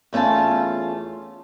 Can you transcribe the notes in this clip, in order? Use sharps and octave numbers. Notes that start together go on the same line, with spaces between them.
E2 A3 C#4 F4 A5